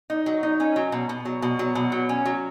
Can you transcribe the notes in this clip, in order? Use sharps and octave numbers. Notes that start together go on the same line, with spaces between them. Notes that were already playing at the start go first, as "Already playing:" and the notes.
D#4
F#3
D#4
C#4
F#3
B2
B2
F#3
B2
F#3
B2
F#3
C#4
F#3